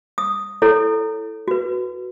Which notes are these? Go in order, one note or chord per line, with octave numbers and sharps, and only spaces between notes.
D#6
E4 A4 C#5
F#4 B4